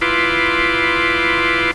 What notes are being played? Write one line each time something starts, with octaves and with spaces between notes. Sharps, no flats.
E4 F4 B4 C6 D6